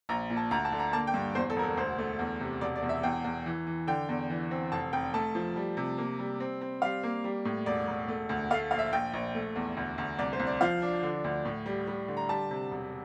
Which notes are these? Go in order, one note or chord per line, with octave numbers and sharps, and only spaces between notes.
A#1 A#5
A#2
A5
D2 A#5
A5
D3
A#5
A#3 A5
G5
G2
E2 C5
A4
E1 A#4
A4
D2 C5
A3
E2
C3
E1 D5
D5
E2
E5
E2 G5
E2
E3
E3
D3 G5
E2
E3
C4
F1 A5
F1 G5
A3 A5
F3
G3
C3
A#3
G3
C4
C4
G3 F5
A#3
G3
A2
E1 D5
E1
A3
D2
A3 F5
A#1 F5
E5
A#1 G5
A#1
A3
E2
D2
D2
C2 D5
C5
C2
D5
F3 F5
D4
D3
D2
A2
G3
G3
D3
A#5
G3 A5
C3
E1